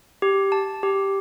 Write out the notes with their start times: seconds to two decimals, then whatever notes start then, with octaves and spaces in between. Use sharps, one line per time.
0.22 G4
0.52 A5
0.83 G4